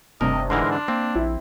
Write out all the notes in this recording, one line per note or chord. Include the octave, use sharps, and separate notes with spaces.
F1 G2 C3 A#4 D#5
G#2 D3 E3 A#4 C6 F6
D4
A#3 C4
A#1 E4